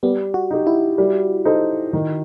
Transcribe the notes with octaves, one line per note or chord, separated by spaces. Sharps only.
G3 B3
F#4
D#4 G4
E4
G3
D#4 A4 C5
D#3